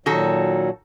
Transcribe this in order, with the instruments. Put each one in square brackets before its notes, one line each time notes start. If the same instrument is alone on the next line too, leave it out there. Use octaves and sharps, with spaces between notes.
[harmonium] A#2 F#3 [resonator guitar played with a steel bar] D#3 F#4 A4